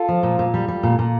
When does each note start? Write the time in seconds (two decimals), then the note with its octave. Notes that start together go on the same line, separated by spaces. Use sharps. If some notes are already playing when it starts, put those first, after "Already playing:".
Already playing: F4 A4
0.09 F3
0.23 A#2
0.39 A#2
0.54 G3
0.68 G3
0.83 A#2
0.99 A#2